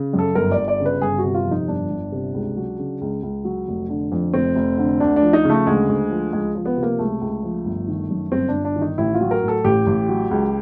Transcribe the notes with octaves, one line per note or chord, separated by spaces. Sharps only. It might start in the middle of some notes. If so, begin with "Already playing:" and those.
Already playing: C#3
F#2
A4
G1 A#4
D5
G1
D5
C#3
B4
G1 G#4
F#4
C3
F4
F2
D#4
G1 D4
G1
C3
C#2
F#3
C#3
C#2
C#2
F#3
F1
D3
F2
F1 C4
F1
D3
D2 D4
D4
F3
D#4
C#3
A3
D2 G#3
D2
F3
C#2 G#3
F3
B3
C3
A#3
C#2 A3
C#2
F3
G1
D#3
F#2
G1 C4
D4
G1
D4
D#3
D#4
A1 E4
F4
F#3
A#4
A2
A4
A1 G4
A1
F#3
C#2